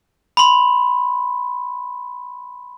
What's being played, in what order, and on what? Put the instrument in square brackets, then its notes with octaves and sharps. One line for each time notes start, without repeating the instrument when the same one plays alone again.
[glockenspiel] B5 C6